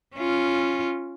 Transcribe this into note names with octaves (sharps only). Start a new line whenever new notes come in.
C#4 F4